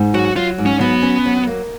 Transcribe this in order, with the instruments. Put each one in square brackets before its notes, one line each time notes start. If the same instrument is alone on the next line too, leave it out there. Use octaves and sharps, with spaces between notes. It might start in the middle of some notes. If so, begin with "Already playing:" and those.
Already playing: [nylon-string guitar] G#2
[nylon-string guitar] F#3 [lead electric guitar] F#4
[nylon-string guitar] F#3 [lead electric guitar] F4
[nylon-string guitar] G#2
[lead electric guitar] C#4
[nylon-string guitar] F#3 [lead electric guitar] B3
[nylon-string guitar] C#4
F#3
A#3